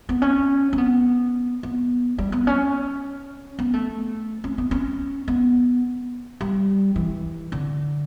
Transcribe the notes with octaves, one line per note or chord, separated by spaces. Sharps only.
B3
C#4
C#4
B3
B3
G3
B3
C#4
B3
A3
C#4
B3
C#4
B3
G3
E3
D3